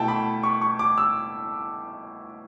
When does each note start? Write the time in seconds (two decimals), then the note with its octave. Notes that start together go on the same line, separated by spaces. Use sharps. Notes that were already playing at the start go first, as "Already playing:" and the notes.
Already playing: B2 A3 E4 F#5 G5 A5
0.08 B5
0.43 C#6
0.61 C#6
0.79 D6
0.98 E6